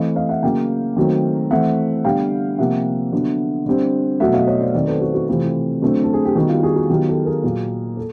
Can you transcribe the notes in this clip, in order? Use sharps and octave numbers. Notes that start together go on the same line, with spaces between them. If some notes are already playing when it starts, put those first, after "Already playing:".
Already playing: E3 A3 C4 D#5 F5
D#5 F5
E5 F#5
C#3 F#3 A#3 F5 G5
D#3 F#3 A3 C4
E3 A3 C4 E5 F#5
D3 G3 B3 F5 G5
C3 F3 A#3 E5 F#5
D3 F#3 B3
D3 G3 C4
B2 F#3 A3 E5 F#5
D#5 F5
C#5 D#5
C5 D5
D#3 F#3 A3 C4 C5 D5
A4 B4
F#4
F#4
C3 E3 A3 C4 F4
F4
D3 F#3 A3 C4
A4
G#4
G4
D#3 G3 B3 F#4
F4 G4
F#4 G#4
F#4
D#3 F#3 B3 F4 G4
G4 A4
G#4 A#4
A#2 F#3 A#3
A4